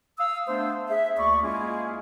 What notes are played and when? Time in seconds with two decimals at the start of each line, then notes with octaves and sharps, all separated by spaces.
0.18 F5 D#6 E6
0.48 A3 B3 D4 C5
0.89 G#4 E5
1.17 D2 A#3 D5 B5 C#6
1.43 G#3 A#3 C#4 E4 F4 G#4